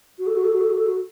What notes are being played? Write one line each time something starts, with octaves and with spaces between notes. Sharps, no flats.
F#4
A4
F#4
A4
F#4
A4
F#4
A4
F#4